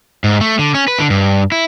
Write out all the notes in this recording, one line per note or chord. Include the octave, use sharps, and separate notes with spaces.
G#2
A3
D3
C#4
B4
D3
G2
E4